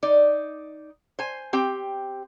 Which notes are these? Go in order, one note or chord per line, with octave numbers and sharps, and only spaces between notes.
D#4 D5
C5 G#5
C4 G4 G5